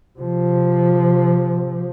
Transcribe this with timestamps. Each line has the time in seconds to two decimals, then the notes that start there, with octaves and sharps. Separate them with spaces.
0.19 C3 F3